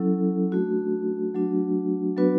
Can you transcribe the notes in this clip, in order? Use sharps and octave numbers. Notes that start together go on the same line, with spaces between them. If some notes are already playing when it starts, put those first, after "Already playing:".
Already playing: F#3 C#4 E4 A4
A3 D4 F#4
F#3 A3 D4 F#4
F#3 B3 D4 F#4 B4